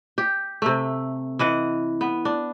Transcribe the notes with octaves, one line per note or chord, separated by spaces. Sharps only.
G4
C3 A3
E3 D#5 F#5
B3
D4